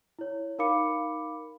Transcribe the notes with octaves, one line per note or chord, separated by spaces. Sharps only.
E4 C#5
D#4 A#4 F5 B5 D6 C#7